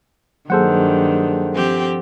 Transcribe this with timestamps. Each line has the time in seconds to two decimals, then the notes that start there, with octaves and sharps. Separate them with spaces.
0.50 G2 D#3 F#3 A#3 G#4 A4 C5 F#5
1.53 F3 C4 G4